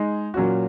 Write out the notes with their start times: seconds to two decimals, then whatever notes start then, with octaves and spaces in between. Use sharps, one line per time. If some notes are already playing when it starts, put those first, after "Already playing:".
Already playing: G#3 D#4
0.34 A#2 F#3 C#4 F#4